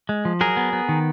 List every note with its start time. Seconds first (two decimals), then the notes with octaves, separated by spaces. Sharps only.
0.09 G#3
0.25 F3
0.41 F#3 G#4 A#4
0.57 B3
0.73 B3
0.89 D#3